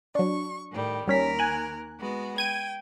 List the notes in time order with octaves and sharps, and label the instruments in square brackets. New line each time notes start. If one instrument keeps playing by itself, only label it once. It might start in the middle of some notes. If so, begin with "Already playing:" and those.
[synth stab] F#3 D4 [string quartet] C#6
[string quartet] A2 D#3 G3
[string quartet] D#2 A#4 [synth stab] G3 C#4 B6
[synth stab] G#5 F#6
[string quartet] G#3 B3 F#4
[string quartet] G5 [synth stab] G#6 D#7